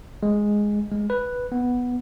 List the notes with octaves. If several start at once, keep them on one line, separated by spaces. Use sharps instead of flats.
G#3
G#3
B4
B3